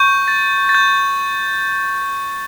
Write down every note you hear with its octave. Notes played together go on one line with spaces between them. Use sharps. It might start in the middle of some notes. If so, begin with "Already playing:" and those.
Already playing: C#6 G6
A6
A6
G6